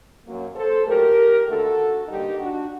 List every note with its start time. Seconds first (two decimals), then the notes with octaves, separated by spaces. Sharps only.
0.25 F#2 F#3 A#3
0.56 A4 C5
0.86 A#2 F#3 A3 G4 A#4
1.47 D#2 D3 A3 F#4 A4
2.08 G2 D3 G3 A#3 D#4 G4
2.39 D4 F#4